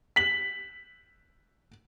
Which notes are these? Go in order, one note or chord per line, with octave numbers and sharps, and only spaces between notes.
B6 F#7